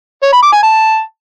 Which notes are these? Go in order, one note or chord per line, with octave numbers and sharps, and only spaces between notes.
C#5
B5
D6
G#5
A5